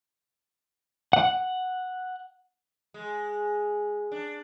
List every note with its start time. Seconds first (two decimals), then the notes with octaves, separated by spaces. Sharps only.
1.13 F#5
2.94 G#3
4.12 D4